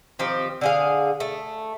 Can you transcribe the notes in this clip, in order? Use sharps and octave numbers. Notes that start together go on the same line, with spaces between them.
D#3 F3 C4 G4
D3 G#4 F5
A3